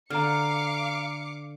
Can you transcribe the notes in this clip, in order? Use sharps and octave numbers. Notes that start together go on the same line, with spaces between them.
D3 F5 A#5 D6 F6 C#7